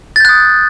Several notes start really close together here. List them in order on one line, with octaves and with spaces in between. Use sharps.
A6 G6 F#6 D#6